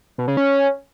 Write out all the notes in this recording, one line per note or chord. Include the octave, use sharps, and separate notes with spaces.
B2
C#3
C#4